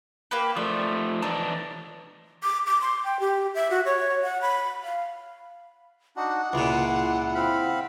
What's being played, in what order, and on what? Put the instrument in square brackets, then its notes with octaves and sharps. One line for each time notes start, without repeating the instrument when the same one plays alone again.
[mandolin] A#3 G4 B4
[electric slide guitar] F3 A3 [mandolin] D5
[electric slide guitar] E3 D5 A5 [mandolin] D#4
[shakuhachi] D6
D6
C6
G5
G4
E5
F#4
C#5
F#5
B5
F5
[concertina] D4 D#4 F#4 [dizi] F#5
[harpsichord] C#2 A#2 [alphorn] E4 [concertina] C6 D6
[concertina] C4 F5 B5